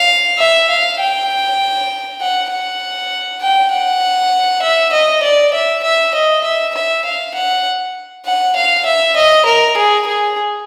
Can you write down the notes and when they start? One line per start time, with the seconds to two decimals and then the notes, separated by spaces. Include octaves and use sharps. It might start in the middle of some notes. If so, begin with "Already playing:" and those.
Already playing: F5
0.39 E5
0.70 F5
1.00 G5
2.21 F#5
2.51 F#5
3.41 G5
3.71 F#5
4.62 E5
4.93 D#5
5.23 D5
5.54 E5
5.84 E5
6.14 D#5
6.44 E5
6.75 E5
7.05 F5
7.35 F#5
8.26 F#5
8.56 F5
8.85 E5
9.16 D#5
9.46 A#4
9.77 G#4
10.07 G#4